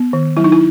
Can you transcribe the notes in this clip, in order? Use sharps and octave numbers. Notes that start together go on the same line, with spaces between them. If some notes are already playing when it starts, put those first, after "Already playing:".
Already playing: B3
D#3
F#3 E4
D#4
E4